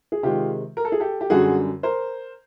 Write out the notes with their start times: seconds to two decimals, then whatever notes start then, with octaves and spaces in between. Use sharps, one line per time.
0.12 G#4
0.23 C3 D#3 G#3 F4 G4
0.77 A#4
0.85 A4
0.92 G#4
1.00 G4 A4
1.21 G4
1.30 F#2 D3 G3 F#4 G#4
1.83 A#4 C5